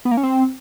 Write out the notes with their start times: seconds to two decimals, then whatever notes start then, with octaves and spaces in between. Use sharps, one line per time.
0.05 B3
0.11 A#3
0.17 C#4
0.23 C4